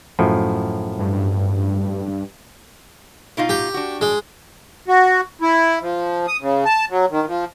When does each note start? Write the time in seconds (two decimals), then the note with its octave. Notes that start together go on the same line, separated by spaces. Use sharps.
0.19 F#2 A2 F3
0.99 G2
3.37 B2 D#4 F4
3.49 G4
3.74 D4 F#4
4.01 G#3
4.88 F#4
5.41 E4
5.81 F3
6.28 D#6
6.41 C#3
6.65 A5
6.90 F#3
7.10 D#3
7.28 F3